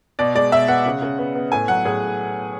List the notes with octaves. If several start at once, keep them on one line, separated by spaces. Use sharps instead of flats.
B2 D5
G#3 D5
B2 E5
B3 F#5
C#3
C#3
B3
B3
A2 G#5
F#3 F#5
A2 G#4